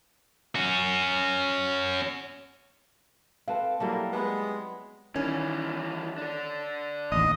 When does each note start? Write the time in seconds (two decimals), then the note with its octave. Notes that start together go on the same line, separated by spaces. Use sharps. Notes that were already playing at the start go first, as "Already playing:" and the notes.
0.55 C#4 F#4
3.48 C4 A4 B4 F5
3.80 F#3 G3 A#3 E4 A4
4.13 G#3 B3 G4 A5 B5
5.16 D#3 E3 G3 C#4
6.18 D4 A4
7.12 A1 D#2 D#5